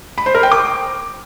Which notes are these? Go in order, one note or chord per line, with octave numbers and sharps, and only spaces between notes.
B5
C5
A#4
G5
D6